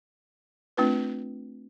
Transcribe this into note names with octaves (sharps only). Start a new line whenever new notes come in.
A3 C4 D4 F4 B4